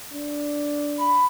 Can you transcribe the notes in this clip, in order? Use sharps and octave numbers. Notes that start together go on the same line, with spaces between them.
D4
B5